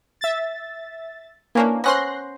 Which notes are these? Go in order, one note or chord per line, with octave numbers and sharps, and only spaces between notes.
E5 A6
E3 A#3 C#4 D4
B3 C#4 C5 C6 F#6 A#6